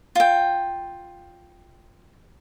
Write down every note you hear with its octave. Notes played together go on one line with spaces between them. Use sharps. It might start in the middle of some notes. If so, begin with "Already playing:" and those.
F4 G5